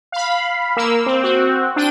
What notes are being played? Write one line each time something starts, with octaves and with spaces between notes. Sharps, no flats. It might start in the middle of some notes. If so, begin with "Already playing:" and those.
F5 B5
A#3 E6
C4
C4 F#4
D4 G5 D#7